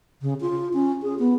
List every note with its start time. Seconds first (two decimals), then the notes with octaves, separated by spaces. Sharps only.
0.22 C#3
0.41 F4
0.74 C#4
1.02 G#4
1.19 B3